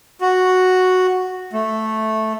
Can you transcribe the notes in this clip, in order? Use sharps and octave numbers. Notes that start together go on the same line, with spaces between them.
F#4
A3